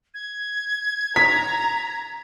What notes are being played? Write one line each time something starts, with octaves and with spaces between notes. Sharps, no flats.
G#6
A#5 B6